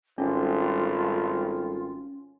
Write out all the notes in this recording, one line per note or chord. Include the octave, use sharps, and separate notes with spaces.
G#1 G3 C#4 F4 A4 G5